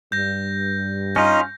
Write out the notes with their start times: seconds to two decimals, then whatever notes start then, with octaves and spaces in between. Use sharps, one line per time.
0.12 G2 G6 A#6
1.16 C#4 D#4 F4 D#5